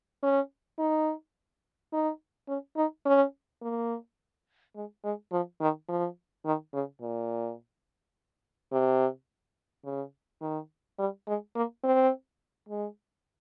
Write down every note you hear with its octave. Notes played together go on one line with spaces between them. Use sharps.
C#4
D#4
D#4
C#4
D#4
C#4
A#3
G#3
G#3
F3
D#3
F3
D#3
C#3
A#2
C3
C#3
D#3
G3
G#3
A#3
C4
G#3